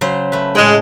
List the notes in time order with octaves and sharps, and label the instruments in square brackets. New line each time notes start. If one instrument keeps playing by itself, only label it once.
[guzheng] C#3 F#3 C5
A3 B4
[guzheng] A2 G5 [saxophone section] G#3